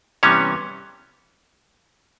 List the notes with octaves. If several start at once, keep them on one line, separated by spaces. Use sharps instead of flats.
C3 E3 G3 B3 C#4 C#5